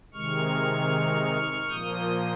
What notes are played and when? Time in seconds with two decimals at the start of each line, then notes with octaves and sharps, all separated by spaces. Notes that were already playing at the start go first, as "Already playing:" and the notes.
0.14 C3 D#3 G#3 C#6 F6
1.69 A#2 F3 A#3 D#6 G6